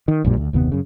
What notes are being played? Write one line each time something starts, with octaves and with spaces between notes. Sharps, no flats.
D#3
A#1 F#2 A#2 G3
D2
F#1 D#2 C3 B3
F#2 C#3